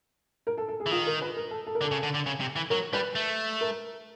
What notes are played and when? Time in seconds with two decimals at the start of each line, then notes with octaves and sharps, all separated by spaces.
0.47 A#4
0.58 A4
0.69 A4
0.80 G#4
0.86 E3
0.91 D#3 F4
1.07 A#4
1.22 B4
1.37 A#4
1.51 A4
1.66 A4
1.75 A#4
1.81 D3
1.84 A4
1.92 C#3
2.03 D3
2.14 D3
2.26 C#3
2.40 C3
2.56 E3
2.70 F#3 A#4
2.93 G3 B4
3.15 A3
3.61 A#4